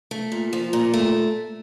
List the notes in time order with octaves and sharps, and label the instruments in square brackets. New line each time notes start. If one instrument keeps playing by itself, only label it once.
[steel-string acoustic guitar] A3
A#2
F3
A#2
A3